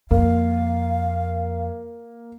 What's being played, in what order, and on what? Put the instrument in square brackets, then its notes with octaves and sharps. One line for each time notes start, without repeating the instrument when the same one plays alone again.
[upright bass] F2 [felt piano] A#3 [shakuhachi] F5